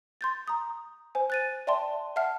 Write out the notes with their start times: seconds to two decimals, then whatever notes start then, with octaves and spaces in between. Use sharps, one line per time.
0.21 C6 G6 A6
0.48 A#5 D#6
1.15 C5 G#5
1.30 F#6 A6 D#7
1.67 D5 E5 G5 A5 C6
2.16 E5 F#5 A5 F6 C7